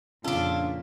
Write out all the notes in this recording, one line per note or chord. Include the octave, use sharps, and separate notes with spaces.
F2 A#2 C#3 D4 F4 A4